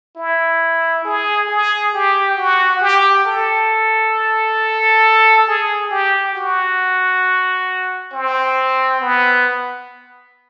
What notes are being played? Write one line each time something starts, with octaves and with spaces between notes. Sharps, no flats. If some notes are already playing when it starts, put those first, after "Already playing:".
E4
G#4
G#4
G4
F#4
G4
A4
G#4
G4
F#4
C4
B3